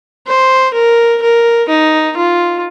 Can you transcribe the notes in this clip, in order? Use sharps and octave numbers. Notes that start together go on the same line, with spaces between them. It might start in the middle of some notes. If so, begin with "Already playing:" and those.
C5
A#4
A#4
D#4
F4